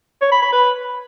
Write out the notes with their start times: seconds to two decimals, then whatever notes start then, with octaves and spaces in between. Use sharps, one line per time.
0.21 C#5
0.32 B5
0.42 B5
0.52 B4